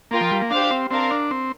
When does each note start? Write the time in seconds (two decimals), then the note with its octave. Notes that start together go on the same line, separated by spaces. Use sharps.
0.11 A#3 F4 A#4 G5
0.21 F3
0.32 G3
0.42 A#3
0.50 D4 G4 C5 F5
0.71 C4
0.90 C4 D4 A#4 F5
1.10 D4
1.31 C4